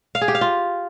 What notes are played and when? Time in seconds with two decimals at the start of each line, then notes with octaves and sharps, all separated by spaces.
0.15 F5
0.21 G#4
0.28 G4
0.35 F5
0.41 F4